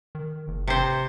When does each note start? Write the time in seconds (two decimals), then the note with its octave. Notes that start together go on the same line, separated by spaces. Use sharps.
0.15 D#3
0.48 F#1
0.67 C3 C5